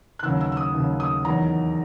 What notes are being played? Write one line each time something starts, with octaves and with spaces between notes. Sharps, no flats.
F#6
D#2 C#3 F#3 E6
E6
E6
D#6
D#2 C#3 F#3
D#6
E2 D#3 F#3 A#5